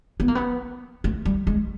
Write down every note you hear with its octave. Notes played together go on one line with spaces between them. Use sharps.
B3
A#3
B3
A3
G3
G#3